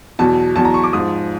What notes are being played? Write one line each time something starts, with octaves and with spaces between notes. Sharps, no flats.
E2 B2 F#3 A5
E2 B2 F#3 A5
A#5
C#6
D6
G#2 F3 D#6